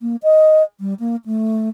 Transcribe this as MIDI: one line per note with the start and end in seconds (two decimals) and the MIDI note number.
0.02 0.16 58
0.23 0.63 75
0.80 0.94 55
1.00 1.16 58
1.26 1.69 57